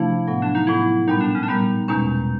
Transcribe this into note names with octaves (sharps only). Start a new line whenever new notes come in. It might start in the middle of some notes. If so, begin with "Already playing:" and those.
Already playing: C3 F3 A3 D4 E4
A2 F#3 B3
D4
D#4
A2 F#3 B3 E4
A#2 G3 B3 D#4
D4
C#4
D4
A#2 G3 B3 D#4
E2 B2 G#3 C#4 D#4